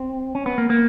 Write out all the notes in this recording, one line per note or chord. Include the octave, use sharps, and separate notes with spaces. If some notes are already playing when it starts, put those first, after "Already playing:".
Already playing: C4
C#4
B3
A#3
A#3